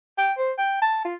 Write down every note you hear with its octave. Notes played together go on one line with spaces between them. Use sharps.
G5
C5
G5
A5
F4